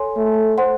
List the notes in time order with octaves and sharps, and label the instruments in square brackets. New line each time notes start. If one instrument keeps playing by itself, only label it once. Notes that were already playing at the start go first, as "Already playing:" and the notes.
Already playing: [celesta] A4 C#5 G#5 C6
[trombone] A3
[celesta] C5 F#5 C6